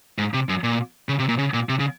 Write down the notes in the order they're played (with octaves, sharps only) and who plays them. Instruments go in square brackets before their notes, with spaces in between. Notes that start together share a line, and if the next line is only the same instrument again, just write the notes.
[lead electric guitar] G#2
C3
F#2
A#2
C#3
C3
A#2
C#3
A#2
C3
C#3